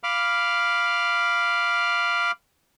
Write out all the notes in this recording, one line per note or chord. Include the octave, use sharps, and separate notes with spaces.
F5 B5 D6 F6